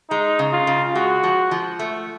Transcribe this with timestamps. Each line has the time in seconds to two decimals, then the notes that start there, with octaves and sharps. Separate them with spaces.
0.10 G#3 D#4
0.39 C#3
0.53 F4
0.67 C#3
0.95 G#3 F#4
1.23 F3
1.51 F3
1.79 A3